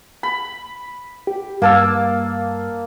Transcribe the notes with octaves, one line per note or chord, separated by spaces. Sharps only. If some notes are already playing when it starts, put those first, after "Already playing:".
B5
G4
G2 A#3 A5 E6